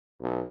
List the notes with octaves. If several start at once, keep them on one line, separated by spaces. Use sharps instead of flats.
B1